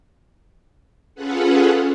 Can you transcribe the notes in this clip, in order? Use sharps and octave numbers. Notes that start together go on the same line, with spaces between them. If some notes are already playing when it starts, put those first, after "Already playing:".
C#4 F4 G#4 A4 B4 F#5